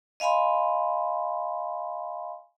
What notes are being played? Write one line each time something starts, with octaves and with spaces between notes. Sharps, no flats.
D#5 F5 G#5 B5 C6